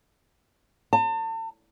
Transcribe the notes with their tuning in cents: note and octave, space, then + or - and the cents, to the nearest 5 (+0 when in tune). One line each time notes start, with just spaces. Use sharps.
A5 +40